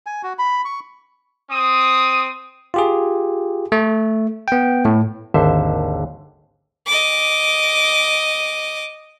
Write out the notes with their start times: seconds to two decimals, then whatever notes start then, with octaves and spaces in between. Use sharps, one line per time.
0.06 G#5
0.23 F#4
0.39 B5
0.65 C#6
1.50 C4 D#6
2.74 F4 G4 G#4
3.72 A3
4.48 B3 G5
4.85 A2
5.34 G#1 D#2 D3 C5 E5
6.87 D#5 D6